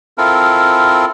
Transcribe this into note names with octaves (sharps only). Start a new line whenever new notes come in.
C4 E4 F4 A4 A#4